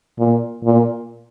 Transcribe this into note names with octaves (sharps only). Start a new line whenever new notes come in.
A#2
A#2